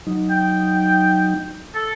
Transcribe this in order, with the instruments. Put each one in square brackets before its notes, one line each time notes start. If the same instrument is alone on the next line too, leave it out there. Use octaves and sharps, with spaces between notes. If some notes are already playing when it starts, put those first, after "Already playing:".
[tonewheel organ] F#3 D#4
[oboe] G5
A4